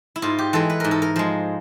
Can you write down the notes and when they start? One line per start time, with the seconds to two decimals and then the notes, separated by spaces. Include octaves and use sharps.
0.16 E4
0.22 G#2 F4
0.38 G4
0.53 E3 G#3 A4
0.70 B4
0.80 G#2 A#4
0.91 A4
1.02 A#4
1.16 F3 G#3